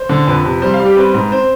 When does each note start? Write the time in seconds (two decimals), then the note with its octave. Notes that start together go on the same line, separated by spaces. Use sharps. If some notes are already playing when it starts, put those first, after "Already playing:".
Already playing: C5
0.09 D3
0.27 F2 B4
0.45 C3
0.62 G3 C5
0.74 F5
0.79 G3
0.86 G4
0.97 C4 B4
1.14 G#2
1.31 C4 C5